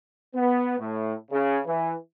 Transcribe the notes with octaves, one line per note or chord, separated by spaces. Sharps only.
B3
A2
C#3
E3